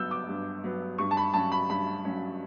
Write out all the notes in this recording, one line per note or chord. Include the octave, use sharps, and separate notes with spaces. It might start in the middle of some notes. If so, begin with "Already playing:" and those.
Already playing: G2 F#3 B3 E6 G6
D6
G2
F#3 B3
G2 C#6
A5
B5
F#3 C#4 A5
B5
G2 B5
F#3 C#4